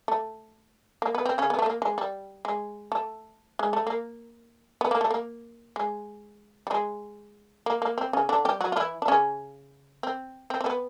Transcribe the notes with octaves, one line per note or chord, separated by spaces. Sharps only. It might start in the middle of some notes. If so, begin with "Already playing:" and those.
A3
A#3
B3
C4
C#3 C#4
B3
A3
A#3
G#3
G3
G#3
A3
G#3
A3
A#3
B3
A#3
A3
A#3
G#3
G3
G#3
A#3
A#3
C4
C#3 C#4
D3 D4
G3 G4
F#3 F#4
F4
E3 E4
D4
C#3 C#4
C4
C4
C4
B3